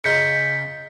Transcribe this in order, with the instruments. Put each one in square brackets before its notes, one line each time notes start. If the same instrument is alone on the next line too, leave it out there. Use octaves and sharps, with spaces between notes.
[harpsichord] C#3 D#4 F4 [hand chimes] G6 B6 C#7